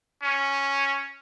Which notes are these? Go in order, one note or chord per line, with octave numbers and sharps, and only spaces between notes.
C#4